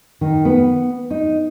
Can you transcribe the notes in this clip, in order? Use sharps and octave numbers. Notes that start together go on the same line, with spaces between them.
D#3
B3
D#4